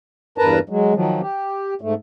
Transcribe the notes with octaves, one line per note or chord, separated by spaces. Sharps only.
E2 G2 A#4 B4 A5 A#5
F#3 G#3
D#3 F3 F#3
G4
G#2 A3